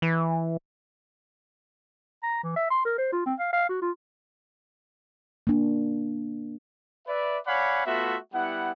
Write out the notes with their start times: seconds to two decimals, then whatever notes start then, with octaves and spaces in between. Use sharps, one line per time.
0.02 E3
2.23 A#5
2.43 E3
2.56 E5
2.70 C6
2.85 A#4
2.98 C5
3.12 F4
3.26 C4
3.39 F5
3.52 F5
3.69 F#4
3.82 F4
5.47 A#3 D4
7.07 B4 D5 E5
7.47 C#5 D5 F5 F#5 G#5 B5
7.86 A3 B3 F4 F#4 E5
8.33 G3 B3 E4 F#5